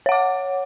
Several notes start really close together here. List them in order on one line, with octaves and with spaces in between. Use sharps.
C#5 F#5 D6